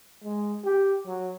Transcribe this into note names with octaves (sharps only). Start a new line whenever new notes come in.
G#3
G4
F#3